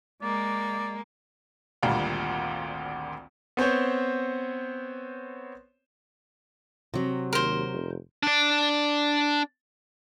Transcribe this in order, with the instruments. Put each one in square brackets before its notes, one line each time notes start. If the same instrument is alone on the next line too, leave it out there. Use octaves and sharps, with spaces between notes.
[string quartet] G#3 A#3 [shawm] D5
[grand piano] G#1 D2 A#2 G3 F5
B3 C4 C5 C#5
[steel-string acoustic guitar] C3 F#3
[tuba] D#2 [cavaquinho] A#4 C5
[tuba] F1
[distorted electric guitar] D4 D5